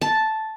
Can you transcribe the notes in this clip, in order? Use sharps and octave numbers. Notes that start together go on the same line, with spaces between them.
A5